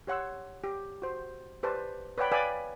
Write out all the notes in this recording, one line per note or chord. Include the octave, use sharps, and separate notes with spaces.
G4 C#5 F#5 C6 E6
G4
F#4 C5
G4 B4 C5 D5 A5
B4 C#5 D5 F#5 G5 B5
B4 D5 F5 G5 G#5 B5